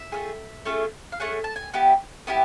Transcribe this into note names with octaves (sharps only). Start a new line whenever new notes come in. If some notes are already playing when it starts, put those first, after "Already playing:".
Already playing: E5
A3 C#4 F4 G#4
A3 C#4 F4 G#4
F5
A3 C#4 G#4 F#5
A5
G#5
B3 E4 G4
B3 E4 G4